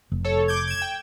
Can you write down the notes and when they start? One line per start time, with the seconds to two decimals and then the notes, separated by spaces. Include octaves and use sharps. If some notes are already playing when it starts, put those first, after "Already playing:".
0.12 F1
0.25 A4 C#5
0.48 D6 G6 G#6
0.67 G#6 E7
0.82 G5